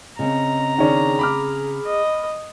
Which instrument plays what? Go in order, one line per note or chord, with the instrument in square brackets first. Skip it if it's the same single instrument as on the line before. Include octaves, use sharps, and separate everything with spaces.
[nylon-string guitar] C#3 C4 [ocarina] D#5 [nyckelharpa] A#5
[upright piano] D#3 C#4 D4 [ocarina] G#4
[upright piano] B5 D6 F6
[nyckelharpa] D#5